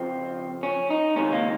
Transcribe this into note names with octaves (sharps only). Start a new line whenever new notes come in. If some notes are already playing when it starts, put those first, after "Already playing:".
Already playing: F2 C#3 F3 C4
C#4
D#4
C#2 C3 D#3 C#4
A#3